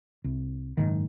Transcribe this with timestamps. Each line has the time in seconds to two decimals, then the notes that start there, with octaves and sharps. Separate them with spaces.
0.24 C2
0.77 F#1 B1 G#2 D#3